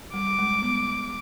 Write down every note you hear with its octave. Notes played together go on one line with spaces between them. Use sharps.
G3 D6
G#3
B3